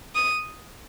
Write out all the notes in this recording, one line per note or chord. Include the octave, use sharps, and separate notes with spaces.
D#6